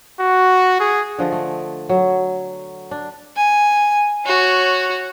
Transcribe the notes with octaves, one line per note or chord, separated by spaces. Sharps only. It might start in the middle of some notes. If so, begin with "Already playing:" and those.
F#4
G#4
D3 F3 D#5
A3
F#3
D4
G#5
F#4 C#5